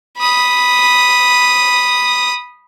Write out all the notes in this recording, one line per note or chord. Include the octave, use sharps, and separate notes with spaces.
B5 D#6